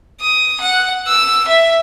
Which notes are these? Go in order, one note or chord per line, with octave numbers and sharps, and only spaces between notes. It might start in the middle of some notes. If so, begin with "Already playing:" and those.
D#6
F#5
E6
E5